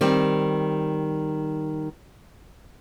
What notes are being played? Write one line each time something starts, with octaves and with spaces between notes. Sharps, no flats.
D#3 G3 C4